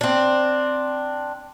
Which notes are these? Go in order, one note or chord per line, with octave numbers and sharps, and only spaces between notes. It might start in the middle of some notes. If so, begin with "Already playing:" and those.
C4 D4